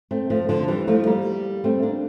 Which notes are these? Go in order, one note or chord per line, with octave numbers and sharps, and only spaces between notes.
A3 C4
F3 A3
D3 F3
E3 G3
F3 A3
G3 A#3
A3 C4
A#3 D4